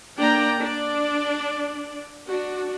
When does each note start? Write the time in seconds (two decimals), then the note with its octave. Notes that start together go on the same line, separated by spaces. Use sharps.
0.19 A#3 D4 D5 G5 A#5
0.58 D4 D5
2.29 D4 F#4